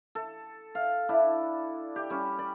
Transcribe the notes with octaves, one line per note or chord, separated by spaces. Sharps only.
A4
F5
D4 E4
G4
G3 C#4
D5